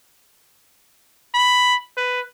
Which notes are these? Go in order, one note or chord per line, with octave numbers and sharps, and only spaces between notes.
B5
B4